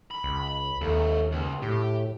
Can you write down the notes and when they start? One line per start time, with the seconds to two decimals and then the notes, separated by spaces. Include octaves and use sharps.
0.11 B5
0.23 C#2
0.48 B5
0.82 D#2 A#3 A4
1.32 C#2
1.62 A2 G4